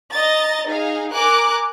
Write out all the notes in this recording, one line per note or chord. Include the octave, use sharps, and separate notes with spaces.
D#5 A#5 A6
D#4 G#4 F5
A#4 G#5 D6 F#6